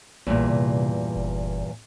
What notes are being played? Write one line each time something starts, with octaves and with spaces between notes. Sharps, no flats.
A#1 E2 G2 A#2
C3
F#1